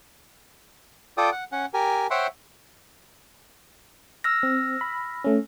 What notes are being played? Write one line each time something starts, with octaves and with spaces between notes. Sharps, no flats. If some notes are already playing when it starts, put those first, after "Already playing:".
F4 A4 D5 G5 D#6
F#5
C#4 F#5
G4 A#4 G#5
C5 C#5 E5 F#5 G5 C6
E6 F6 A#6
C4
B5
A3 C#4